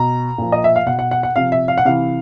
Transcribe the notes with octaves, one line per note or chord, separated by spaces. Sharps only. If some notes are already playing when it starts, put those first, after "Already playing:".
Already playing: B2 A#5
A#2 F3
D#5
E5
F5
B2 F#5
F#5
F#5
F#5
C3 F3 F5
E5
F5
F#5
C3 E3 F5